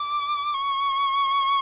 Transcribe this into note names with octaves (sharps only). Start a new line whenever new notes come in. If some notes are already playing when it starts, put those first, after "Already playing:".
Already playing: D6
C#6